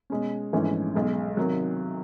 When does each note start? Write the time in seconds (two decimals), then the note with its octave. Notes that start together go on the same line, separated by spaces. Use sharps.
0.10 B2 G#3 C#4
0.53 A#1 G#2 E3 A3 C#4
0.95 B1 B2 G#3
1.37 C3 D#3 F#3